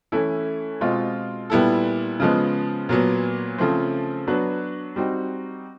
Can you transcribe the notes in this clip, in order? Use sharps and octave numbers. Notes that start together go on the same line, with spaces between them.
E3 A3 C#4 E4 A4
B2 G#3 C4 F4
A#2 G3 B3 E4 A4
C#3 F3 G#3 B3
A#2 F#3 B3
C#3 F3 A3 C4
F#3 B3 D4 F#4 B4
G3 C4 D#4 F#4